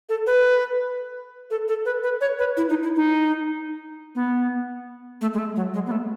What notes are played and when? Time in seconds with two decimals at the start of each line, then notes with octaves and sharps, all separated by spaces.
0.09 A4
0.27 B4
1.51 A4
1.68 A4
1.86 B4
2.03 B4
2.21 C#5
2.39 B4
2.57 E4
2.69 D#4
2.83 E4
2.96 D#4
4.15 B3
5.21 A3
5.34 G#3
5.38 A3
5.56 F#3
5.74 G#3
5.86 B3
5.91 A3